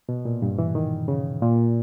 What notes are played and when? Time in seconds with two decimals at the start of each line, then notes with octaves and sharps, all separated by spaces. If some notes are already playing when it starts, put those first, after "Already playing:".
0.09 B2
0.25 A#2
0.42 G2
0.58 E3
0.75 D#3
1.08 C#3
1.42 A#2